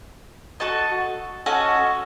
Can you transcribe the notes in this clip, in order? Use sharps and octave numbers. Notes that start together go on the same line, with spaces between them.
F#4 A4 D#5 A5
C#4 F#4 A4 D#5